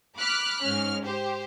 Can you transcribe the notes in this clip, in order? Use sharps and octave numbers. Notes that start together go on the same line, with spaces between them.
B5 D6 F6 F#6 B6
G#2 C#4 F6
G4 C5